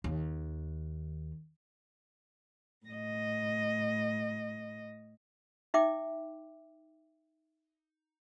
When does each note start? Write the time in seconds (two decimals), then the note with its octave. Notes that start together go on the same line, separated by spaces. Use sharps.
0.04 D#2
2.86 A2 D#5
5.74 D#4 E5 G5 D6